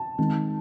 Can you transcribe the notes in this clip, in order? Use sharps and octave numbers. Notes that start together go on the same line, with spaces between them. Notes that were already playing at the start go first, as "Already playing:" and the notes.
Already playing: A5
D#3 G#3 C4